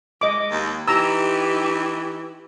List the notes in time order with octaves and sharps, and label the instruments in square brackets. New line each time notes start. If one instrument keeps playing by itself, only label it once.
[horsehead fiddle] G#3 [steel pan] D#5 D6
[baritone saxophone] D#2
[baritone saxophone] E3 [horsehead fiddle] D#4 G4 [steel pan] A#5 E6